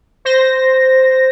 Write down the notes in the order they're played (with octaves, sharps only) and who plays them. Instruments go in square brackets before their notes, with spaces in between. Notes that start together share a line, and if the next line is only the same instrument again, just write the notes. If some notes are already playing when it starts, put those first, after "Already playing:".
[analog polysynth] C5 A#6